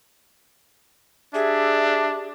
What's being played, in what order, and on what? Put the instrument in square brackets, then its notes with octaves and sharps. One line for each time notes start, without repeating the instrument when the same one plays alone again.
[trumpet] D4 [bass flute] G4 [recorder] G#4 [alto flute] E5